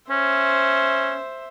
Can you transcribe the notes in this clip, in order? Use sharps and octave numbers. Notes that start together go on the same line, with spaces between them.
C#4 C5 E5